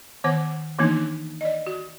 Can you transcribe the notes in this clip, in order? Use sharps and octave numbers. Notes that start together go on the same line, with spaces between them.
D#3 B3 C5 F#5
D#3 E3 A#3 B3 D4 D#4
D5 D#5
F#4